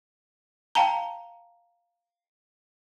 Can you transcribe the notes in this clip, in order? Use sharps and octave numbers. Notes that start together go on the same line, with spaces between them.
F5 G5 A5 A#5